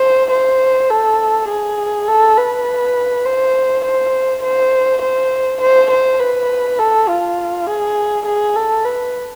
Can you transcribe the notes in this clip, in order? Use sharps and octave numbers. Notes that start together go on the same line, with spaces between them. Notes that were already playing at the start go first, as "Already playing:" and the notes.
Already playing: C5
C5
A4
G#4
A4
B4
C5
C5
C5
C5
C5
C5
B4
A4
F4
G#4
G#4
A4
B4